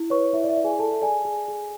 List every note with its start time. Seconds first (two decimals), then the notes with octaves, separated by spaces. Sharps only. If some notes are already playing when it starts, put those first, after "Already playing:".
Already playing: E4
0.10 B4 C#5 C#6
0.33 E4 E5
0.44 D5
0.49 E5
0.57 D5
0.64 G#4 G#5
0.79 A4 D5 A5
1.02 G#4 D5 G#5
1.25 G#4
1.48 G#4